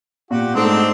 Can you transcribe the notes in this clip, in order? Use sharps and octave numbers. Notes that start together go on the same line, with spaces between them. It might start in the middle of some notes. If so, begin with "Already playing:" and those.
A#2 F#4 G4
G#2 A3 C4 D4 D#4